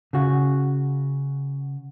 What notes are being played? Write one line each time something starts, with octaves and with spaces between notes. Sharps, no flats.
C#3 F#4